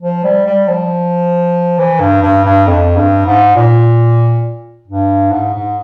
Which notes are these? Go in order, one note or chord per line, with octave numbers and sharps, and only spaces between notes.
F3
G3
G3
F3
E3
G2
G2
G2
F2
G2
G#2
A#2
G2
G#2
G#2